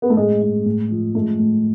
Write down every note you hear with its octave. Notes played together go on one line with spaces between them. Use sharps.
B3
A3
A2 G#3
G#3
A2
F3
G#3 A3
A2